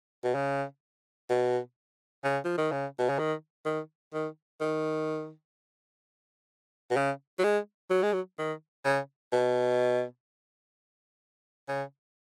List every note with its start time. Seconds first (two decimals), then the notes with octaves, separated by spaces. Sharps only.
0.24 B2
0.35 C#3
1.29 B2
2.24 C#3
2.44 F3
2.57 D#3
2.72 C#3
2.98 B2
3.09 C#3
3.19 D#3
3.65 D#3
4.13 D#3
4.61 D#3
6.91 B2
6.96 C#3
7.39 F#3
7.44 G#3
7.90 F#3
8.03 G#3
8.13 F#3
8.38 D#3
8.85 C#3
9.32 B2
11.68 C#3